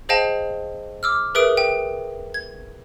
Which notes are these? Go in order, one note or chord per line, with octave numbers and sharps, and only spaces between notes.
G#4 C5 D#5 F5 G5 A5
D6 E6 F6
G#4 A#4 B4 E5 D#6 D7
G5
G#6